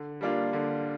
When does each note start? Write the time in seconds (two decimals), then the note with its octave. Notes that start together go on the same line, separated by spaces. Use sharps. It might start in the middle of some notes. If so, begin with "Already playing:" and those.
Already playing: D3
0.21 G3 A#3 D4 F4
0.53 D3